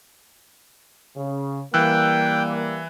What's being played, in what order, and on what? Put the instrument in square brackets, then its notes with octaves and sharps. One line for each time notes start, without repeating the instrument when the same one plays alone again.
[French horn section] C#3
[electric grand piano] E3 E6 F#6 [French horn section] G3 A#3 [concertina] G5